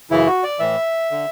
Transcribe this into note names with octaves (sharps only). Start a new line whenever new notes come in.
F#2 C#3 E3 E4
F#4
D5
A2 E3 E5
D3